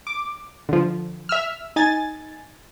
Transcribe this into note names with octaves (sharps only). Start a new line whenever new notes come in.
D6
D3 F3
E5 E6 F6
D#4 G#5 A6